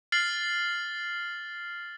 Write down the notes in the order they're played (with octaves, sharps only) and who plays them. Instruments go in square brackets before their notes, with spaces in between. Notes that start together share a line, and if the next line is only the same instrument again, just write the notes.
[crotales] F6 A6 C7 F#7